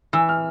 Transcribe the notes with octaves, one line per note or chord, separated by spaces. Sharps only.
E3 E6
F6